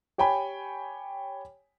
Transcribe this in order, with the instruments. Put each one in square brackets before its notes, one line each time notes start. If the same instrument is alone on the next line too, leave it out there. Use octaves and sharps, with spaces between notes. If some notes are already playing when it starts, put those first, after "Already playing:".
[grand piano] G4 C#5 G5 G#5 B5